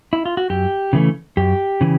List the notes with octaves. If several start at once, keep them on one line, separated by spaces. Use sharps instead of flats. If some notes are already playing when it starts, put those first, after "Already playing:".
E4
F4
F#4
F#2 G4
C#3 E3 A3
F#2 G4
C#3 E3